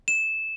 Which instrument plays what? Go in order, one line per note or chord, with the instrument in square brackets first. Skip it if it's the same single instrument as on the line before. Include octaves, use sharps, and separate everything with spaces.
[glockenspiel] E7